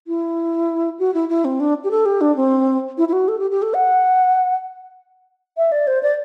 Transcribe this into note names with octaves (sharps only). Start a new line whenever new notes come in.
E4
F#4
E4
E4
C4
D4
G4
A4
G4
D4
C4
E4
E4
F#4
A4
G4
G4
A4
F#5
E5
D5
C5
D5